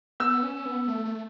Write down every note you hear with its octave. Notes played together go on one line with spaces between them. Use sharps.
B3 E6
C#4
B3
A3
A3